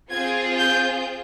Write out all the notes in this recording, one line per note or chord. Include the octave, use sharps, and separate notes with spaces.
C4 F4 G#4 G#6
G6